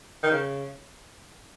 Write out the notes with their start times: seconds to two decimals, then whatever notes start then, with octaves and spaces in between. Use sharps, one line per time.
0.23 D#3
0.31 C#3